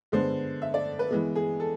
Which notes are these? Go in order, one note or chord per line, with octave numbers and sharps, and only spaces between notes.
D3 G#3 B3 C5
E5
D5
B4
E3 G#3 B3
G#4
A4